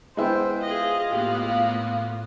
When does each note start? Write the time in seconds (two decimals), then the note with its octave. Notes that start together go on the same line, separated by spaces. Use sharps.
0.17 G#3 B3 E4 C5 G5
0.62 F4 G#4 D#5 F5
1.12 A2 A#3 B3 G4